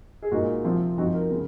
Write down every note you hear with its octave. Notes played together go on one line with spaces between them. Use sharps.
G#4
A#2 G#3 D#4 F#4
C3 F3 C4
F3 C4 D#4 F#4
A#4
C#3